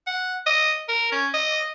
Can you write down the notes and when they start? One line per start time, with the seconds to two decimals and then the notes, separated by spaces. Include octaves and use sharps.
0.07 F#5
0.46 D#5
0.89 A#4
1.12 C#4
1.34 D#5